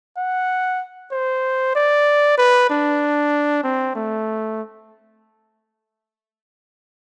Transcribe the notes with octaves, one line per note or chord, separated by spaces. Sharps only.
F#5
C5
D5
B4
D4
C4
A3